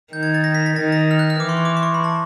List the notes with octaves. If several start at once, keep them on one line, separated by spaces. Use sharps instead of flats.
D#3 G6
G#6
A6
A#6
B6
A6
D#3 A6
A#6
F6
F#6
F6
E3 D6
C6
C#6
D6
C6
C#6
B5
A5